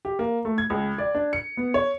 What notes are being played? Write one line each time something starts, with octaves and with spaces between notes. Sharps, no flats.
G4
A#3
A3
G#6
C#2
D5
D4
C#7
B3
C#5